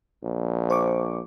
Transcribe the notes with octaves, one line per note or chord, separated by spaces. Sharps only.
A#1
C5 C#6 D6